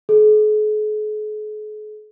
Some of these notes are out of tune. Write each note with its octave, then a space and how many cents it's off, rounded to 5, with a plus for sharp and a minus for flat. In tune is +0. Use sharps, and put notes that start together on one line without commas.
G#4 +45